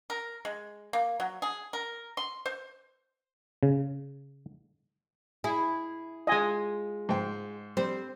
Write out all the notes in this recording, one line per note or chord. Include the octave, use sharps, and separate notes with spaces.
A#4
G#3
A#3
F#3
G#4
A#4
C6
C5
C#3
E4 G#4
G#3 F4 D#5 G#5
G#2 C5 G5
G3 C4 C5